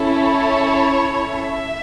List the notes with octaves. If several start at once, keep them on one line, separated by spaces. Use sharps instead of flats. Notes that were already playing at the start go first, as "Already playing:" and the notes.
Already playing: C#4 E4 A4
C#5
E5